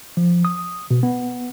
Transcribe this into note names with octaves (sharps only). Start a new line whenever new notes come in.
F3
D#6
B2
B3